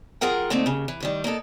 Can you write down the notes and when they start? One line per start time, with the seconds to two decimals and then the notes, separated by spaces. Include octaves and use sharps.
0.21 F#2 F4 G#4 A#4 F#5 G5
0.50 D3 A3 A#3 C4 D#4
0.66 D#2 C#3
0.88 E3
1.00 A2 D#3 G3
1.24 A#3 B3 D#4 A4